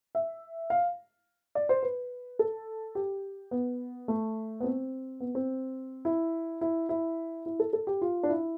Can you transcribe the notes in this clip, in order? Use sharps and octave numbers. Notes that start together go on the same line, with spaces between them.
E5
F5
D5
C5
B4
A4
G4
B3
A3
B3
C4
B3
C4
E4
E4
E4
E4
A4
A4
G4
F4
D4
E4